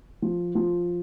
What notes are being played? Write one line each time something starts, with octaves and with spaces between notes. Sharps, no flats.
F3
F3